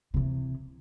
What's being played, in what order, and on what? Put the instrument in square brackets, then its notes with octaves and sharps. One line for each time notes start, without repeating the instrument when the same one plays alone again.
[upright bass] C3 E3